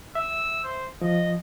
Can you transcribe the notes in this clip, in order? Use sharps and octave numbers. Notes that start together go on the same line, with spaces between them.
E5 E6
C5
F3 D#5